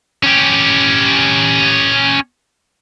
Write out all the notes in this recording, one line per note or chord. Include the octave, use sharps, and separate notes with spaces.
C#4 G4